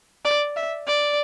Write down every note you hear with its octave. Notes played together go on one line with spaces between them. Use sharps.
D5
E5
D5